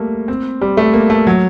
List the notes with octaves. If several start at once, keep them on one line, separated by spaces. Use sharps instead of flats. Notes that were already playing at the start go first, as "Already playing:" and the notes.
Already playing: G3 A3 A#3
C4
G3
A3
A#3
A3
F#3